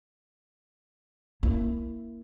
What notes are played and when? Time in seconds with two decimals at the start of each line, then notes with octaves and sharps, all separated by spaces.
1.43 A#3 E4